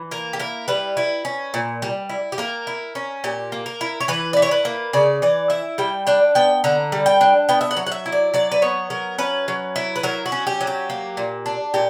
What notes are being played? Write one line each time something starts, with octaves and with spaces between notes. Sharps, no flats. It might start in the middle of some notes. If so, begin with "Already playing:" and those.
Already playing: E3
A#3 A#4
G4
E4 A#4
G3 B4
E4
C#4
A#2
G3
E4
G4
A#3 A#4
E4
C#4
A#2 G4
A#3
A#4
E4
C#5
E3 B4
E4 D5
C#5
B4
A#3
C#3 D5
E3 D5
E4 E5
G3 G5
D4 G5
B3 G5
D3 A#5
G3
G5
D4
B3 G5
E5
F#5
F#3
F#5
E5
E4
D5
F#3 D5
B4
B3 C#5
F#3 A#4
C#4 B4
F#3
E4
B4
F#3 A#4
F#4
C#4
G4
F#3
G4
A#3
A#2
D4
A#2 G4